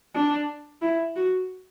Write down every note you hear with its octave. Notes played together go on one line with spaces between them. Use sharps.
D4
E4
F#4